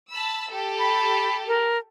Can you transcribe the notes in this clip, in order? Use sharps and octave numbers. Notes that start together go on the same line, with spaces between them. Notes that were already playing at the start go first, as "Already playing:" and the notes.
A5 B5 E6
G4 A4
B5
A#4